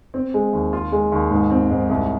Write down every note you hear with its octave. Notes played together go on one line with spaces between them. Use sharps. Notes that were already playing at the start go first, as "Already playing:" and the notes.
C4
G#3
D#2
F4
G#3
D#2
G#2
C4
G#2
C2